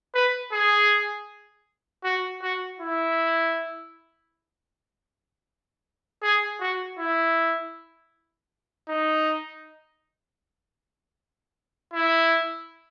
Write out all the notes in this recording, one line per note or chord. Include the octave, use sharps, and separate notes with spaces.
B4
G#4
F#4
F#4
E4
G#4
F#4
E4
D#4
E4